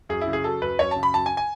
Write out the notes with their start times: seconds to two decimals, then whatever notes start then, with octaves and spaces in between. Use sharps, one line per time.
0.09 F#2 G#4
0.21 E4
0.27 C#3
0.33 G#4
0.44 F#3 A4
0.62 F#2 B4
0.79 F#2 C#5
0.91 C#3 A5
1.03 B5
1.14 F#2 A5
1.26 G#5
1.37 G#5